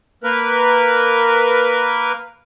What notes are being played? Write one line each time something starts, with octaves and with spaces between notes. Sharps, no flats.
A#3 A#4 B4